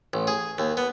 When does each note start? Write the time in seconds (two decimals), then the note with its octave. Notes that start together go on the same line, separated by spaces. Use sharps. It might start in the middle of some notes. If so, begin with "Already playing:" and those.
0.13 A1
0.27 G#4
0.58 D#2
0.77 B3